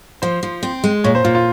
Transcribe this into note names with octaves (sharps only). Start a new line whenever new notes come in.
F3 C5
F3
C4
G#3
A#2 C#5
C5
A#2 F4
F4